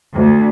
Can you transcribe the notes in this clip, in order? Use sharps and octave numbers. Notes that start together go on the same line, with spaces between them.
D2